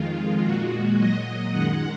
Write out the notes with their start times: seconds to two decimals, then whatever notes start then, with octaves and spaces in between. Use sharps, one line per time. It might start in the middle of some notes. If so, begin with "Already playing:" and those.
Already playing: F2 D#3 G#3 F4
0.43 A#2 G#3 F#4
0.97 A#2 F#3 D#5
1.51 F#2 D#3 G#3 F#5